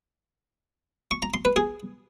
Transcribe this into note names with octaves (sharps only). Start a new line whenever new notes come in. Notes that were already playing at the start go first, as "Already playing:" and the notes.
C#6
A#5
C6
B4
G#4